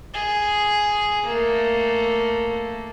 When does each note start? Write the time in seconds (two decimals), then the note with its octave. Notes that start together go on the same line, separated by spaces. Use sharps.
0.14 G#4
1.26 A3 A#3